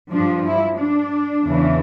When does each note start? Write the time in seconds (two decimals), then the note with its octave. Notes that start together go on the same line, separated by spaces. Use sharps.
0.11 G2 F3 D4
0.44 E4
0.77 D4
1.44 E2 C#3 E3